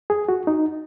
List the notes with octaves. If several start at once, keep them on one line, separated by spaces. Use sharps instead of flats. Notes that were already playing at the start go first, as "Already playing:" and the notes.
G#4
F#4
D#4